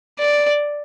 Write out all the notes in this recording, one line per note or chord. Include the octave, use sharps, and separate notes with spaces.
D5